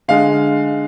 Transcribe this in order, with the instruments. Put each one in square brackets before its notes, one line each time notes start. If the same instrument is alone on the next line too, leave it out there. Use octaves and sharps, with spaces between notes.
[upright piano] D3 G#3 F5